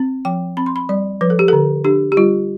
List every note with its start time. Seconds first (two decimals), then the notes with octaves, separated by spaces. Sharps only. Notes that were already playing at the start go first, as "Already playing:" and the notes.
Already playing: C4
0.25 F3 G5
0.57 C4 B5
0.66 C6
0.76 B5
0.89 G3 D5
1.21 F3 B4
1.30 A4
1.39 G4
1.48 D3 A4
1.84 D4 G4
2.12 G4
2.17 G3 F4